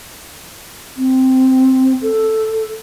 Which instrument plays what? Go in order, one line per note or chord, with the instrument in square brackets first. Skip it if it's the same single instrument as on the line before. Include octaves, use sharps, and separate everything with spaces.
[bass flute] C4
A4